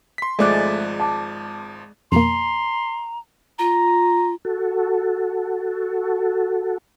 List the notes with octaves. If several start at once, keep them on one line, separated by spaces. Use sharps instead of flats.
C6 B6
G#1 F3 G#3 A3 D5 F#6
A5 D6
F2 B2 A#3 A#5 C6
F4 A#5
F#4 A4